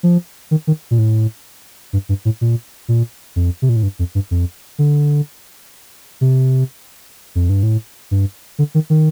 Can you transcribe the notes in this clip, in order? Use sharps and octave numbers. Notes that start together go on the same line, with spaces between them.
F3
D#3
D#3
A#2
A2
G2
G2
A2
A#2
A#2
F2
C3
A#2
A2
G2
F2
G2
F2
D3
C3
F2
G2
A2
G2
D3
D#3
D#3